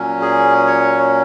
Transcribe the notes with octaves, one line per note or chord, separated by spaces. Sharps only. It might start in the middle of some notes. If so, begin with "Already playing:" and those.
Already playing: A#2 F#3 C#4
G#4
C#5